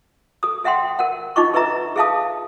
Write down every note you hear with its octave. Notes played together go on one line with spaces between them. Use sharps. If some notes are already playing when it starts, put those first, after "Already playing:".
A4 D#6
A4 E5 F#5 G5 C6
A#4 F#5
D4 D#4 F4 D#5 C#6 D6
A4 B4 D#5 E5 A#5
G#4 A4 E5 F5 A5 D#6